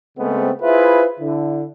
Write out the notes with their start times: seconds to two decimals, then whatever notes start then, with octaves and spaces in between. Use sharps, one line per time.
0.18 C#3 G#3 A3 B3 C4
0.62 E4 F4 G#4 B4 C5 E5
1.19 D3 E4